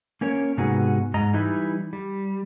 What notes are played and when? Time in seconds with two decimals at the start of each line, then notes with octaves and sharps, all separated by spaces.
0.21 A#3 C#4 A#4 C#5
0.57 G#2 C3 B3 D#4 F#4 G#4
1.14 G#2 D#5 A#5
1.33 E3 G3 D#4 E4
1.93 G3